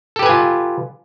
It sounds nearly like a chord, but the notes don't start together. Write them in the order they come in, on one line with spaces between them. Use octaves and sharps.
A4 G4 B4 G#5 F4